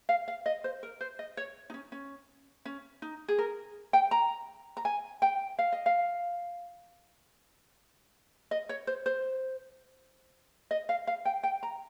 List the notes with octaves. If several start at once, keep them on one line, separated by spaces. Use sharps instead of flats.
F5
F5
D#5
C5
A#4
C5
D#5
C#5
D#4
C#4
C#4
C#4
D#4
G#4
A#4
G5
A#5
A#5
G#5
G5
F5
D#5
F5
D#5
C#5
C5
C5
D#5
F5
F5
G5
G5
A#5